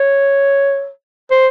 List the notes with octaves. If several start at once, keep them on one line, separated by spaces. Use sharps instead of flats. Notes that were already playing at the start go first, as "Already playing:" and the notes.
Already playing: C#5
C5